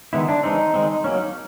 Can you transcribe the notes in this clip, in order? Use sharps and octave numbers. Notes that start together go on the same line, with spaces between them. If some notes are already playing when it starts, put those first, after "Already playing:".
D#3 G#3 B3 E4
D4
E3 G#3 C4 D#4
D#3 G#3 C4
F#3 A#3 C#4